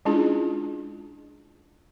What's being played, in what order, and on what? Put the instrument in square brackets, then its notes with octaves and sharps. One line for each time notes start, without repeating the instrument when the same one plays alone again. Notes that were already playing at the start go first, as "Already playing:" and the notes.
[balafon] G#3 C#4 D4 E4 F4 G#4